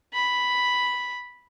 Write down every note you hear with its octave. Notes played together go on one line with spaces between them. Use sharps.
B5